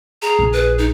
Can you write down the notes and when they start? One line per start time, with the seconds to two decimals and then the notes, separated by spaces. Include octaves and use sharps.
0.22 G#4 A#5
0.39 A#1
0.53 B4
0.78 D#4